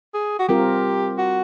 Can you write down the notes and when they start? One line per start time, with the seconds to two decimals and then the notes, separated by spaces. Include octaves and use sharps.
0.14 G#4
0.39 F#4
0.48 G3 C4 F4 G4 A#4
1.18 F#4